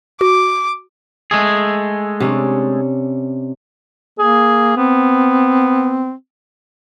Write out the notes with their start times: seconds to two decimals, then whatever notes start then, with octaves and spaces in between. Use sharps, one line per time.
0.21 F#4 D6
1.31 G#3 A3 G#4
2.20 C3 C#4 D4
4.19 A#3 G#4
4.76 B3 C4